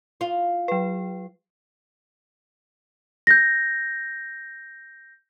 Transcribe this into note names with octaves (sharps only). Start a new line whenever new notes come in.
F4
F#3 B4
G6 A#6